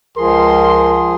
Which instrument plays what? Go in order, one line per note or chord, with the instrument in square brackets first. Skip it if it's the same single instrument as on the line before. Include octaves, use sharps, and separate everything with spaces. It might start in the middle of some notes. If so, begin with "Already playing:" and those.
[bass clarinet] C#2 [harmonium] F3 G#4 [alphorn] A#4 [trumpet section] C6